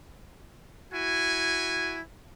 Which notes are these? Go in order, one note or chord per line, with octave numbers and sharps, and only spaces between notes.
E4 F#4 G#5